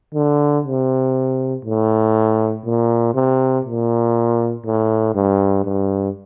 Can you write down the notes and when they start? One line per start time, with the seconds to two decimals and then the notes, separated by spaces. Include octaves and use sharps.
0.14 D3
0.65 C3
1.65 A2
2.65 A#2
3.14 C3
3.65 A#2
4.65 A2
5.15 G2
5.64 G2